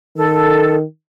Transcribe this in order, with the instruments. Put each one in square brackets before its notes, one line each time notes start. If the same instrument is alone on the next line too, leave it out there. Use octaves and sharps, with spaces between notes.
[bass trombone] D#3 [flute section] A4